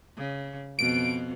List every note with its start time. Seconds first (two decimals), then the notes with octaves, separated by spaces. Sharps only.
0.17 C#3
0.79 F2 B2 B3 D7